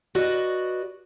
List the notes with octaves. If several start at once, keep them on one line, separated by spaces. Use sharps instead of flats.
F#4 B4 D5 D#5